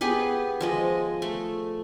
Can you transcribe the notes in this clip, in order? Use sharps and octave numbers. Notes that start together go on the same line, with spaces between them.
B3 G4 G#4 B4
F3 G#3 D#5
A3